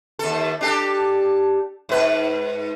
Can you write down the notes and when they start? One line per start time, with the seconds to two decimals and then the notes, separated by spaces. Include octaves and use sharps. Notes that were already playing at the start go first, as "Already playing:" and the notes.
0.19 D#2 A4
0.61 D4 G4 A4
1.89 G#2 B4